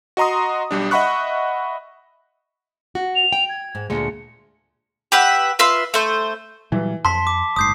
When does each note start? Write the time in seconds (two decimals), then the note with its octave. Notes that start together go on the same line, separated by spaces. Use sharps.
0.17 F#4 D#5 A#5 C6 D#6
0.71 B1 G3 D4
0.91 D#5 E5 F#5 B5 C#6 F#6
2.95 F#4
3.15 F7
3.32 G5
3.49 G#6
3.75 G#2
3.90 D2 A#2 G#3 C#7
5.12 G4 B4 E5 F#5
5.59 F4 B4 E5 C6
5.94 A3 C5
6.72 A#2 E3 F#3 G3
7.05 F2 A5 C6 B6
7.27 D6
7.56 F#1 G#2 D#6 G6 C7